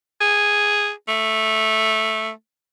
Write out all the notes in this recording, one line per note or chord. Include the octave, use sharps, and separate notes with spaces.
G#4
A3